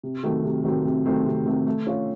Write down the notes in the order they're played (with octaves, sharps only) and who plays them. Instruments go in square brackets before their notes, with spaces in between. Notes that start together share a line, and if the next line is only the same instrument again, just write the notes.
[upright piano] C3
D#3 F#3 A3 C4
C3
D#3 F#3 A3 C4
C3
D#3 F#3 A3 C4
C3
D#3 F#3 A3 C4
A3
C#4 F4